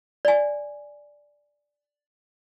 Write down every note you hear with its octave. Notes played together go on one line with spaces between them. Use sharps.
D5 G#5